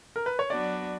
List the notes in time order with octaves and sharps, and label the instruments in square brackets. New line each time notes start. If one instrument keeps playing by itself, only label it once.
[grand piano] A#4
B4
C#5
[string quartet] F#3 B3 D4 F#4 [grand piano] D5